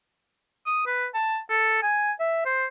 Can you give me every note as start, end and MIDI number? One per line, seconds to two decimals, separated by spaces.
0.66 0.84 87
0.86 1.07 71
1.14 1.38 81
1.50 1.81 69
1.83 2.12 80
2.20 2.45 76
2.46 2.66 72